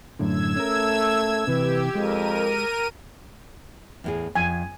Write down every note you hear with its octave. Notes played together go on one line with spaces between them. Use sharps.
F#2 A2 D3 E6 G#6
A3 C#4 A#4
C3 E3 G4 B4
F2 G#3 A#4 D#7
E2 A2 G#4
F2 G#5